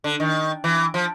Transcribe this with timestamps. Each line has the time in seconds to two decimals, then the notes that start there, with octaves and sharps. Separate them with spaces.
0.04 D3
0.20 D#3
0.64 E3
0.94 F3